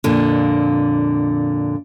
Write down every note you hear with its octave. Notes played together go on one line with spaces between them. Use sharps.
F2 A#2 D3